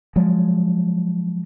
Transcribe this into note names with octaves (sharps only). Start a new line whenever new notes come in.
F3 F#3 G#3